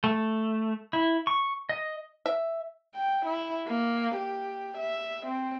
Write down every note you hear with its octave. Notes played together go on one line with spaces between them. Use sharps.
A3
E4
C#6
D#5
E5
G5
E4
A#3
G4
E5
C4